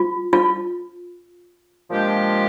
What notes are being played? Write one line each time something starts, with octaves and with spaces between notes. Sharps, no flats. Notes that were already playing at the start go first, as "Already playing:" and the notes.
Already playing: F4
F4
A#2 F3 G#3 D4 G4